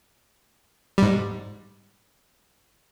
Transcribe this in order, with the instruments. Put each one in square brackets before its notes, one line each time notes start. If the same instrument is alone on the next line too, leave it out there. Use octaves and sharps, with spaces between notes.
[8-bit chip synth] G#2 G3